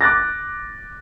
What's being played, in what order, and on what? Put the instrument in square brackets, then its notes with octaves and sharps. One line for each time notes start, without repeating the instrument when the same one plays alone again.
[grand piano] D6 F#6 A6 A#6